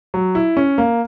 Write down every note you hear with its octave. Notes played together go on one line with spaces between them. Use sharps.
F#3
E4
C#4
A#3